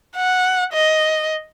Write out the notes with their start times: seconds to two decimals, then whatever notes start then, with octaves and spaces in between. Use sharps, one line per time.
0.16 F#5
0.73 D#5